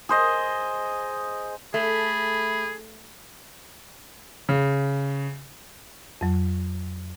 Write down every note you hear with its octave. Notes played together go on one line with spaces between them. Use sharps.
G#4 C5 D#5
A3 G#4 B5
C#3
F2 F#3